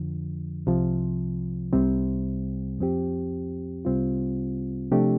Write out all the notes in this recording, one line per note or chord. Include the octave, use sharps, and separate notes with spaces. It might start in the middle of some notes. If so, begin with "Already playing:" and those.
Already playing: F2 D3 F3
C2 C3 F3
C2 C3 G3 C4
F2 F3 C4 G4
C2 C3 G3 C4 F4
C3 F3 A3 D4 G4